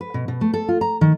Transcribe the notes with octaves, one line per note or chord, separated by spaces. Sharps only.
B4
B2
B2
A3
A4
F4
A#5
D#3